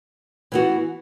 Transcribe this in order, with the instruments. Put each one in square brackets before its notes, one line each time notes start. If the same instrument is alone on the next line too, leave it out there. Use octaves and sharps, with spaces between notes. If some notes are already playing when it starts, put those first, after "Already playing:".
[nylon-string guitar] E3 B3 F#4